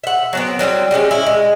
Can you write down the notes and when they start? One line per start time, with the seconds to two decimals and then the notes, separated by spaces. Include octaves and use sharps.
0.04 E5 F#5
0.33 F#3 B3 C4
0.59 F#3 G3 B3 C4
0.91 G3 G#3 C4 C#4
1.11 E4
1.27 G#3